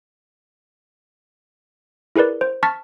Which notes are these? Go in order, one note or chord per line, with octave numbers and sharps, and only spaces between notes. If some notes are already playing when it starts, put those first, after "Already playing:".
E4 G#4 A#4 B4 D5
C5
A5 C#6 F6 A6 B6